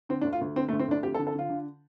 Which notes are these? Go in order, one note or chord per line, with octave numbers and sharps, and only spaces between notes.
D3 C4
D4
D2
F4
D2
D3 C4
A3
D2
C4
D2 D4
F2 G4
A4
D3
A4
D3 F4
D3